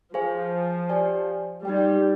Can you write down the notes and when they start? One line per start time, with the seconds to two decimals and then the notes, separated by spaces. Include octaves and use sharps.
0.14 F3 G#4 C5 F5 G#5
0.89 G4 D5 G#5
1.65 G3 D#4 G4 D5 G5